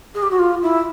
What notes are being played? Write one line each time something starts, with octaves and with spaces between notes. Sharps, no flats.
G#4
G4
F#4
F4
E4